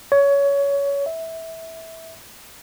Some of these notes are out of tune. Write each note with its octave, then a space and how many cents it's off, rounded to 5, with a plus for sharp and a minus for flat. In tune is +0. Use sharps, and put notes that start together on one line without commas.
C#5 +20
E5 -15